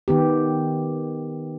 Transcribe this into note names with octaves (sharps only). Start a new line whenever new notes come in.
D#3 B3 G4